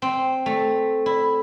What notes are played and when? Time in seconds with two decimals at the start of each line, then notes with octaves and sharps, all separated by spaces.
0.02 C4
0.46 A3
1.06 E4